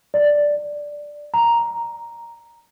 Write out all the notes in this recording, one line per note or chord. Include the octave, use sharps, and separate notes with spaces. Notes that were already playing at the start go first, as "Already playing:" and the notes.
D5
A#5